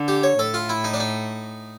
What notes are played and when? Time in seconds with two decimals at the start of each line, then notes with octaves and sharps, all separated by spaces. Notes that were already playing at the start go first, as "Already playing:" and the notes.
Already playing: D3
0.08 G4
0.23 C#5
0.39 A2 A4
0.54 F4
0.69 E4
0.84 D#4
0.94 D4
1.00 D#4